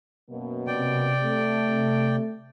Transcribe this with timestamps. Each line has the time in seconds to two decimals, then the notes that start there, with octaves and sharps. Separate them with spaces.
0.30 F#2 B2 A#3
0.67 C3 D5 G5
1.22 A3